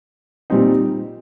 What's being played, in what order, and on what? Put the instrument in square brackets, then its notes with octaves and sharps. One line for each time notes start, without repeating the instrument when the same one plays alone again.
[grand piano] A#2 G3 C4 D#4